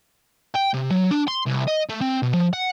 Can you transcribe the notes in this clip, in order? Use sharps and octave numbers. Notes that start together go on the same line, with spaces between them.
G5
C3
F#3
D4
C6
C2
D#5
A3
C4
B2
F3
F#5